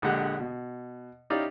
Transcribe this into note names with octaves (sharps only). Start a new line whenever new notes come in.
A#1 D3 G#3 G4 F#5
B2
C#4 D#4 E4 G4 D5 F5